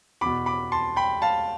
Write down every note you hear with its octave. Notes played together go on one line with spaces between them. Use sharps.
E2 B2 B5 D6
B5 D6
A5 C6
G5 B5
F5 A5